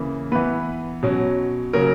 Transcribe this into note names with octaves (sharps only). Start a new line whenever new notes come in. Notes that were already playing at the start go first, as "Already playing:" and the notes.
Already playing: C#3 E3 A#3
E3 B3 B4
B2 F#3 C#4
C#3 F#3 A#3 C#4 A#4